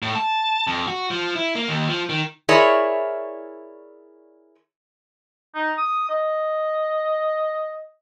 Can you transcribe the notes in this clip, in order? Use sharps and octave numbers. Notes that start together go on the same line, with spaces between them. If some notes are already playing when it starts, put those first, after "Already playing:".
A2
A5
F2
F#4
F3
E4
A#3
D#2
F3
D#3
E4 G#4 A#4 C#5 D5 E5
D#4
D#6
D#5